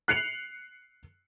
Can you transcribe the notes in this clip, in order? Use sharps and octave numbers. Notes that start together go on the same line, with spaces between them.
F#6 C7 C#7 F7 F#7